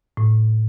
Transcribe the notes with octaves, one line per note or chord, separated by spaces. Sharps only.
A2